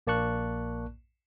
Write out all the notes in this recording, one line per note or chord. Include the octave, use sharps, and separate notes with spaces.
A#1 A#3 D5 A5 C#6 F#6